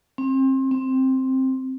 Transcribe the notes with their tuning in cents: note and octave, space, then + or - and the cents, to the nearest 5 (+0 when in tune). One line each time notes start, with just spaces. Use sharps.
C4 +30
C4 +5